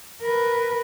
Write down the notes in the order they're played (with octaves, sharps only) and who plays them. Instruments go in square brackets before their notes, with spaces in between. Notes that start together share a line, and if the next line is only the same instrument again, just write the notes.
[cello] A#4 B4